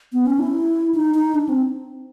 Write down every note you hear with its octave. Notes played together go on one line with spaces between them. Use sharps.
B3
C#4
E4
D#4
D#4
D4
C4